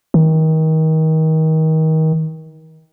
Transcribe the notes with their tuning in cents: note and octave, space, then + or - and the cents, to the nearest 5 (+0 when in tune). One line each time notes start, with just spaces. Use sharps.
D#3 +30